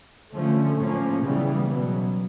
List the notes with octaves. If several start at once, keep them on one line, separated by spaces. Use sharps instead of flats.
D3 F3 A3 C#4
A2 F3 A#3 C#4
C#3 E3 G3 B3
B2 F#3 B3